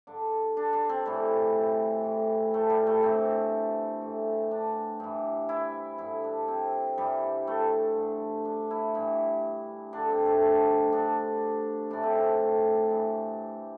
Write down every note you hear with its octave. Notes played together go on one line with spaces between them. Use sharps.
G2 D3 D4
D4
D4
C4
A2 E3 G3
A2 E3
A3
G3
A3
G2 E3 C4
A2 E3
D4
G2 E3
E4
G2 D3 E4
D4
C4
G2 E3 G3
A3
G2 D3
D4
E4
G2 E3
G2 D3 D4
C4
A3
A3
G2 D3 D4
A2 E3 D4
C4
D4
A3
G2 E3